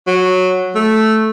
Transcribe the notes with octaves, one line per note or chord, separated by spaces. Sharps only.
F#3
A3